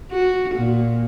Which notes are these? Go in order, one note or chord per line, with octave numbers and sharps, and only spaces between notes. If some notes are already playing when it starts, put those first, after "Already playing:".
F#4
A#2